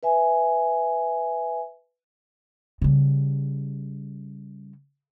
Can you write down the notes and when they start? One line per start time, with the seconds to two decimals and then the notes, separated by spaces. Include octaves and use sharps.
0.03 B4 E5 G#5
2.82 C#3 G3